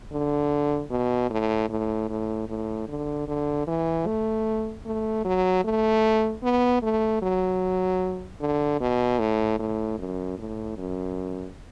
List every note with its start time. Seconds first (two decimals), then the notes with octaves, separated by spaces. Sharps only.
0.12 D3
0.90 B2
1.30 A2
1.69 A2
2.09 A2
2.49 A2
2.88 D3
3.28 D3
3.67 E3
4.06 A3
4.86 A3
5.25 F#3
5.64 A3
6.43 B3
6.83 A3
7.22 F#3
8.40 D3
8.81 B2
9.19 A2
9.59 A2
9.99 F#2
10.38 A2
10.78 F#2